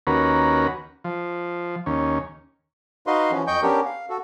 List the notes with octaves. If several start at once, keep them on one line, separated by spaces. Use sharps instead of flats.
D#2 C#4 F#4 A#4 B4
F3
D#2 C#4
D#4 F#4 B4 D#5 F5 C6
E3 F3 C#4
F2 D#5 G5 C#6 G6
B3 C#4 D4 G4 A#4
F5
F#4 A4